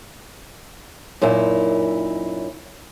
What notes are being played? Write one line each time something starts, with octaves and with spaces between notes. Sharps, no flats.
F#2 A#2 D#4 E4